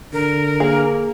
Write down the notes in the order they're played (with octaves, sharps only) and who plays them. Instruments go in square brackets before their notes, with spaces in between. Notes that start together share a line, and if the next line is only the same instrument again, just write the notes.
[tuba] D3 [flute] A#4
[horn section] A#3 [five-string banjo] G#4